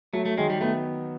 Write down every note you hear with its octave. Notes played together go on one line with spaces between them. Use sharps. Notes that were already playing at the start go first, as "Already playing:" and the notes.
F#3 A3
A3
D#3 G#3
G3
A3 B3